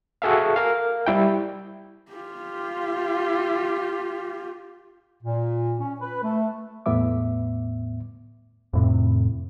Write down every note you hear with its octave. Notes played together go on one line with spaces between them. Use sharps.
F#4 G#4 A4 E5 F5
A#4 F5
G3 E4 G5
F4 G4
A#2
C#4
B4
A3
E2 A2 B3 E5 D6
F2 A2 C3